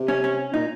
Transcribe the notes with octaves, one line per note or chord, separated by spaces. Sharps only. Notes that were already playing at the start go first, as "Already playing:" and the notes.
Already playing: C3
C#4
C#4
A#2 D#4